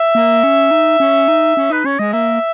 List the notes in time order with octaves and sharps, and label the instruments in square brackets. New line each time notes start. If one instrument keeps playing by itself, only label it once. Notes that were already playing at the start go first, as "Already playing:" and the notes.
Already playing: [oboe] E5
[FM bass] A#3
C#4
D#4
C#4
D#4
C#4
[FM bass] D#4 [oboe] B4
[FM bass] C#4 [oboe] C#5
[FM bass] G#3 [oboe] D#5
[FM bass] A#3 [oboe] E5